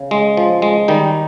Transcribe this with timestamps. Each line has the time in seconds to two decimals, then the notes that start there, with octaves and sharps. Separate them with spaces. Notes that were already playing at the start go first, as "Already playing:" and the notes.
Already playing: C#3
0.11 G#3
0.37 F3
0.62 G#3
0.88 D#3 G3 D#4